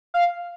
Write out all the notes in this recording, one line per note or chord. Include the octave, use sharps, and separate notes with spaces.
F5